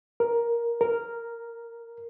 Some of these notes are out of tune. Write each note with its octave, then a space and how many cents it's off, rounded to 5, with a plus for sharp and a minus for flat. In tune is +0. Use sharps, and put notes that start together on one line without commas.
A#4 +10
A#4 -5